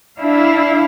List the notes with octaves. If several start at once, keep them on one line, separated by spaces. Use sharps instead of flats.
D4 E4 F5